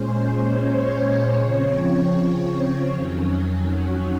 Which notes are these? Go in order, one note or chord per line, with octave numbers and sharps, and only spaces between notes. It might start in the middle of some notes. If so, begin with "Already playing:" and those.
Already playing: A#2 G#3 C#4 C5
C5
C#5
C#3 F3 C4
F2 D#3 F#3 C#4
F#4